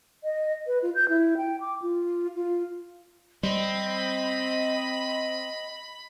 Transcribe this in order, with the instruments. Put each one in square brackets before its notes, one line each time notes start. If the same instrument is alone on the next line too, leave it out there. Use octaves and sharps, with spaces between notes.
[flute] D#5
B4
F4
G6
E4
G5
D6
F4
F4
[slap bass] G3 [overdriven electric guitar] C4 [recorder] D#5 [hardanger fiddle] B5